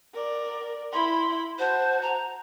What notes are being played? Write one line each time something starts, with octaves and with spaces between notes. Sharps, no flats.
A#4 D5
E4 B5 C6
F#4 C5 A5
A#5